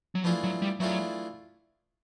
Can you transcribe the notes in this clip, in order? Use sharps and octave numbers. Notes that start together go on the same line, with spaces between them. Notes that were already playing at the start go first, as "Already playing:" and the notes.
F#3
E3 F3 A3 D4 F4 G#4
F#3
G3
E3 F#3 A3 D4 F4 G#4